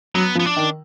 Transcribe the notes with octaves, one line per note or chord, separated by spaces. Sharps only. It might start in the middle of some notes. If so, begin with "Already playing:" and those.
F#3 B3
F3
B3
D4
D#3